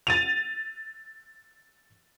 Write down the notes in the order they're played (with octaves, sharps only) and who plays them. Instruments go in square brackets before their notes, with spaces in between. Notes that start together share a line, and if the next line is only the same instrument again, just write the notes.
[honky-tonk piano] A6 D#7 F7